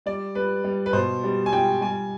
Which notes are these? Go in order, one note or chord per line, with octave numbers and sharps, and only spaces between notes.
G3 D5
G3 B4
G3
B4
B2 C5
G3
G#5
G3 G5
G3 G#5